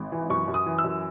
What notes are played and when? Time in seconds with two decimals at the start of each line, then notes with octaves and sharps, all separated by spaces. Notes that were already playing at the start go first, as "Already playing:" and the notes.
Already playing: G#1
0.12 E3
0.30 F#2 C#6
0.48 F#2
0.54 D#6
0.66 E3
0.78 E6
0.84 F#2